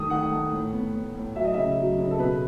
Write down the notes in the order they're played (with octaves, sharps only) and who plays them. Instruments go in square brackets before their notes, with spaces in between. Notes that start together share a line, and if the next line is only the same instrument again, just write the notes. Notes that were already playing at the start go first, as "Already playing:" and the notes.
Already playing: [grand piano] D#3 A3 D#6
D#3 F#5
A3
A2
B3
A2
A2
F#3 E5
D#5
C#3 E5
F#3
C#3
A4
B2 B4